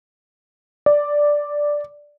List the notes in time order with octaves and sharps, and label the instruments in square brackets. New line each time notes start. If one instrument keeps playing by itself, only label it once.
[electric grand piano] D5